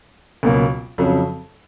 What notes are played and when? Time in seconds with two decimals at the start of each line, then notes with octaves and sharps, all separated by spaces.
0.43 C#2 B2 F#3 A#3
0.98 F2 C#3 F#3